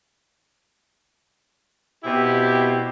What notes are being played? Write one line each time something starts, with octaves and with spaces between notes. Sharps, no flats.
B2 C4 E4 G4